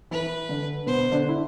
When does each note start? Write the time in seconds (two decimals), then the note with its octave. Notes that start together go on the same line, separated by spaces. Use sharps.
0.11 E3 E4 B4
0.49 D3 D4
0.86 B2 B3 C5
1.12 D3 D4
1.29 E4